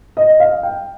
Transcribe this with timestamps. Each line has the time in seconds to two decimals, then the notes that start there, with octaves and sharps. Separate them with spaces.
0.17 D#5
0.40 F5
0.63 G5